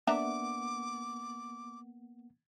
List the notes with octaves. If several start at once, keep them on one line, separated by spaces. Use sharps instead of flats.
A#3 B3 D4 E5 F#5 A#5 D6